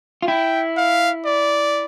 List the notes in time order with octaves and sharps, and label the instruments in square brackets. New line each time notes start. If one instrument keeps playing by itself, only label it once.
[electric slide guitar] F4
[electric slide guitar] E4 [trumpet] G5
[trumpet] F5
D5